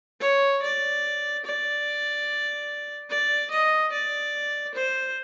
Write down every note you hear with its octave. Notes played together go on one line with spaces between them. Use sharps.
C#5
D5
D5
D5
D#5
D5
C5